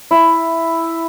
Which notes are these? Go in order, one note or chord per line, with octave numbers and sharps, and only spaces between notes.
E4